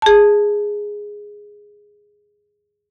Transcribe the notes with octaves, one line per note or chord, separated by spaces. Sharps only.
G#4 A5